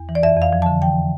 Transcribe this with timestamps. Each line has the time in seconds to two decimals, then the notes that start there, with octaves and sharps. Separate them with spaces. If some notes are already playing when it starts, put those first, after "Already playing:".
Already playing: E2
0.09 E3
0.15 D5
0.23 F2 E5
0.37 F2 F5
0.53 F3
0.62 D3 A5
0.82 E3 G5